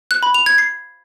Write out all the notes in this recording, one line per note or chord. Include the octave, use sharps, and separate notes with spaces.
F#6
B5
F7
G#6
C7